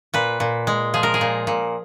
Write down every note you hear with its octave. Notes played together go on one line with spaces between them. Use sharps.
A#2 B4
A#2
G#3
F3 G#4
A#4
G#4
A#2
A#2